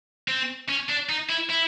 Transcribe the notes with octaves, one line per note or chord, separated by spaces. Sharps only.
C4
C#4
D4
D#4
E4
E4